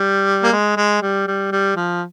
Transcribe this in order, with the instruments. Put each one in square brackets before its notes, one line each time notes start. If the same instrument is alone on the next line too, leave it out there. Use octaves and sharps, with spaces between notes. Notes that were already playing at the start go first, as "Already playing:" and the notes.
Already playing: [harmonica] G3
A#3
G#3
G#3
G3
G3
G3
F3